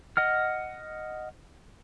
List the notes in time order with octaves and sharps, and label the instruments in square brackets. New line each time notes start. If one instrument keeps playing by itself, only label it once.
[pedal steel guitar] D#5 F#5 F6